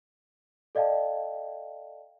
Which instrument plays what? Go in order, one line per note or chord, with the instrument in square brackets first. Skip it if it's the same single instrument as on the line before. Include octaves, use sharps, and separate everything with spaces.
[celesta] A4 D5 D#5 F5 G5 A5